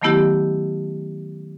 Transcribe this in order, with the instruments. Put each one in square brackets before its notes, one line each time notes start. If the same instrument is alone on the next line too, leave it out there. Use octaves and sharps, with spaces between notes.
[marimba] D#3 F#3 A3 B3 E4 G4